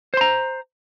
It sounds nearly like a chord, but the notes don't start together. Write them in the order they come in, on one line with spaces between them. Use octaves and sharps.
C5 C6 A#5